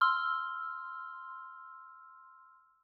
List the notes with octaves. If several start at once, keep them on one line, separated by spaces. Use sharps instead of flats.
C6 E6 F6